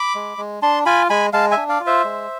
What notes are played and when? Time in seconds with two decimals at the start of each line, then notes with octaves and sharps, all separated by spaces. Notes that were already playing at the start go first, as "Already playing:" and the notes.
Already playing: B5 D6
0.15 G#3
0.38 G#3
0.62 D4 A5 C6
0.85 F4 G#5 B5
1.10 G#3 G#5 B5
1.33 G#3 F5 A5
1.51 E5 G#5
1.57 D4
1.69 D5 F5
1.80 F4
1.86 C5 E5
2.04 G#3